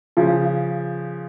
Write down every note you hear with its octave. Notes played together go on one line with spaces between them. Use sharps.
C#3 F3